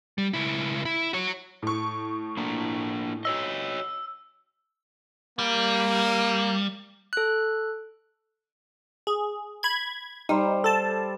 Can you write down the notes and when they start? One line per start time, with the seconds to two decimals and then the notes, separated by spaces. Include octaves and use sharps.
0.18 G3
0.33 C#2 E4
0.85 E4
1.13 F#4 C#5
1.62 A2 C#6
2.37 A#3 D4
3.25 F#4 C#5 D#5 E6
5.39 G3 A#3
7.13 A4 F#6
9.07 G#4
9.63 B5 G#6
10.29 G3 D#4 C5
10.64 A4 A5